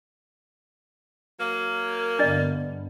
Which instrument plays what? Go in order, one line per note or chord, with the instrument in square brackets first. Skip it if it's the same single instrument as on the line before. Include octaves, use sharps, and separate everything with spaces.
[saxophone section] F#3 A#3
[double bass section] G2 D3 B3 [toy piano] D4 D5 D#5